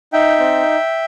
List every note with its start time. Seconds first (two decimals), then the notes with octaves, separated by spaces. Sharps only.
0.13 D#4 E5 G5
0.40 C4